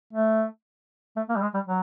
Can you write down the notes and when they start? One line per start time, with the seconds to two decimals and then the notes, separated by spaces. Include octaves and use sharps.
0.13 A3
1.16 A3
1.29 A#3
1.36 G3
1.42 G#3
1.54 G3
1.67 F#3